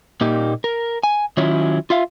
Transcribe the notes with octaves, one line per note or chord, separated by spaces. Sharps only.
A#2 A#3 D#4 G4
A#4
G#5
D#3 F#3 C#4 E4 F4
F4 E5 F5